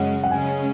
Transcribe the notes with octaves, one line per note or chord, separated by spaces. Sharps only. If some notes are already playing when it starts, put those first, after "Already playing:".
Already playing: F#2 C#3 G#3 C#4 F#5
F#5
C#3 G#3 C#4 G#5